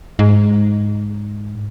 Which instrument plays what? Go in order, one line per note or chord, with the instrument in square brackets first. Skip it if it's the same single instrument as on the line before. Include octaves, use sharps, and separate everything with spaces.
[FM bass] G#2